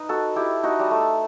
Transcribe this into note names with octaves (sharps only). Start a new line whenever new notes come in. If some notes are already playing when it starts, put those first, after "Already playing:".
Already playing: D#4 B4 D#5
F#4 A4
E4 G4
D#4 F#4
G3
A3